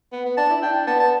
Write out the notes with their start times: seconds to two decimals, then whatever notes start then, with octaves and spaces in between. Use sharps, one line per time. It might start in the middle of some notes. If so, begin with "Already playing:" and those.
0.12 B3
0.26 B3
0.37 D4 A5
0.50 E4
0.63 D4 G5
0.87 B3 A5
1.00 A5